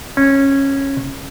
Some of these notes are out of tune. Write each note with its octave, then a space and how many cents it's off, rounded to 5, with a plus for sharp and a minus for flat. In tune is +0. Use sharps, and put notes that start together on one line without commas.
C#4 -15